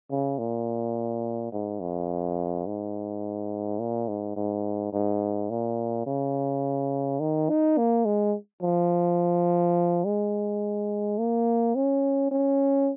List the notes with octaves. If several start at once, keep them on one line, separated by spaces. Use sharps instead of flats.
C#3
A#2
G#2
F2
G#2
A#2
G#2
G#2
G#2
A#2
C#3
D#3
D#4
A#3
G#3
F3
G#3
A#3
C#4
C#4